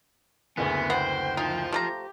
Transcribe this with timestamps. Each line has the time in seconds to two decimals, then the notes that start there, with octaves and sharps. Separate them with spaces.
0.57 F#1 D2 B3 G#4
0.90 B3 C5 F#5 G5
1.37 D#4 F4 C5
1.72 F3 A3 G4 A#5